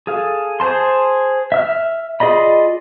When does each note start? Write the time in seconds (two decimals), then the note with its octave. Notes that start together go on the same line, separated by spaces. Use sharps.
0.07 G#4 A4 F5
0.60 G#4 C5 A5 C6
1.52 E5 E6 F6
2.20 F4 G#4 D5 D#5 B5